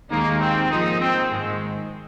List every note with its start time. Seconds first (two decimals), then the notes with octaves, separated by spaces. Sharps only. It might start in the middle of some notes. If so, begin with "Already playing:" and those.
0.10 D#2 D#3 G#3 A#3 D#4
0.40 C4
0.70 G#2 F3 A#3 D#4 G#4
0.99 C4
1.30 G#2 D#3 G#3